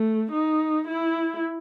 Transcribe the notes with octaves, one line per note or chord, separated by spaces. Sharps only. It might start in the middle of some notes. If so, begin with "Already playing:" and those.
Already playing: A3
D#4
E4